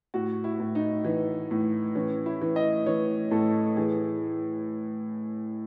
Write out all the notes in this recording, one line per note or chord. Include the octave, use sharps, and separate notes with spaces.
A2 F#4
E4
A2
D#4
E3
A2
E3 C#4
E4
E3
D#5
E3 C#5
A2 A4
E3 G#4